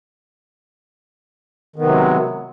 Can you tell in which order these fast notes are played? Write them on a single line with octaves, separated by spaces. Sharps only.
D#3 B3 C3 F#3 G#3